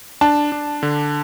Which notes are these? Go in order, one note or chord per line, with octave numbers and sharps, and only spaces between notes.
D4 A5
D4
D3